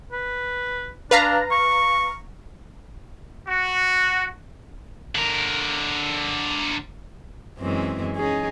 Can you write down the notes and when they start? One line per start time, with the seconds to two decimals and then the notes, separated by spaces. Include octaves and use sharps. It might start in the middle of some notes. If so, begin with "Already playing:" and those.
0.12 B4
1.11 D4 B4 F5 A#5
1.51 C#6
3.48 F#4
5.15 D3 A#4
7.59 F#2 E3 G#3 C4
8.16 C#4 D#4 G#4